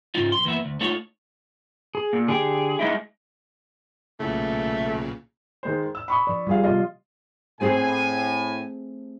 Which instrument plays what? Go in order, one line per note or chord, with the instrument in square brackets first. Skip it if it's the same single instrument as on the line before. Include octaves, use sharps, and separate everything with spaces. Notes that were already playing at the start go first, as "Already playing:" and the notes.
[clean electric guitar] G#2 C#3 F3 D#4 F4
B1 C6
E3 A#3 B3 E5
D2
A3 D#4 F4 F#4 A4 C#5
[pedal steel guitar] G#4
[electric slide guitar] A#2
[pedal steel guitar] D3 G4 G5 [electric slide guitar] G#4
[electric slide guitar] G#3 D#4 E4
[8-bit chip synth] B1 A#2 C#3 [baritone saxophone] A3
[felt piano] D#3 G#3 C5
E6
B5 C#6 D#6
[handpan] F3 D5
[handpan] G3 G4 [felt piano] F4 G#4 F5
[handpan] C3 B3 F5 [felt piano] F4 D#5
[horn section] A2 G#5 [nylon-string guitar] A3 C4 G#4